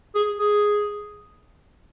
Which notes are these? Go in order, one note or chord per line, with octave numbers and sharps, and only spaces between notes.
G#4
G#4